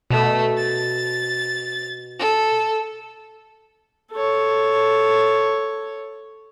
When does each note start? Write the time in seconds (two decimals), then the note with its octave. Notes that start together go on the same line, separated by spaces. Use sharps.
0.10 B2 A3
0.57 A6
2.19 A4
4.13 A4 C#5